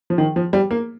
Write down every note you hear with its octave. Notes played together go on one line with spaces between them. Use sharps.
F3
D#3
F3
G3
A#3